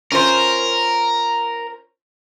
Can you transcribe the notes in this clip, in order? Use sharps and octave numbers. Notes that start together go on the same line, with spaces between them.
C#4 F4 A#4 C5